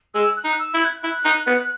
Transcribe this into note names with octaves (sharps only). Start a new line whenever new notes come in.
G#3 E6
F#6
D#4
E6
E4
G#6
F#6
E4
D#4
B3